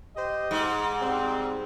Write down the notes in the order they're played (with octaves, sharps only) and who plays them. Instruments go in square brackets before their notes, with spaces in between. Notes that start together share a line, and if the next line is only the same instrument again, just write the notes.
[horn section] G4 C5 D#5
[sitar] G#2
[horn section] G3 C4